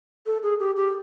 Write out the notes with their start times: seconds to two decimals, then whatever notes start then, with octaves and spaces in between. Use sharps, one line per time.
0.26 A4
0.43 G#4
0.60 G4
0.76 G4